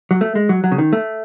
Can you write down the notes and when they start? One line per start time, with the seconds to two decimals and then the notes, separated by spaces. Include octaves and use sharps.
0.11 F#3
0.21 A3
0.35 G#3
0.49 F#3
0.64 F#3
0.72 C#3
0.78 D#3
0.93 A3